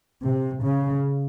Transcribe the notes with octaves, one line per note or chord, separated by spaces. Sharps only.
C3
C#3